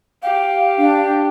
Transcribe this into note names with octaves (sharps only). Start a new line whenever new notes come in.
G4 F5
D4